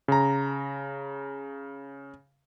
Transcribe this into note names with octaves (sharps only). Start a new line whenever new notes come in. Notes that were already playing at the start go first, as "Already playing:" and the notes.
C#3 A#5